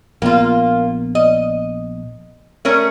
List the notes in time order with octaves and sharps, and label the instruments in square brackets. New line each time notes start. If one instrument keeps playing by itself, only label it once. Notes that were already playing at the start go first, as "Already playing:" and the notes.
[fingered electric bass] A#1 B3 [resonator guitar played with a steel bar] A#3 F4
[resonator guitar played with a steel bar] D#5
A3 C#4 A#4